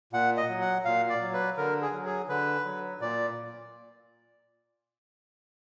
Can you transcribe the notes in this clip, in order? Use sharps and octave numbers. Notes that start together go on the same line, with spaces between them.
A#2 F#5
D#5
F#3
F#5
A#2 F5
D5
F#3
B4
D3 A#4
G#4
F#3
G#4
D3 B4
F#3
A#2 D5